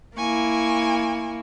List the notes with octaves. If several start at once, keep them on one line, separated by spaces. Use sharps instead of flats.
A#3 E4 G#5 C#6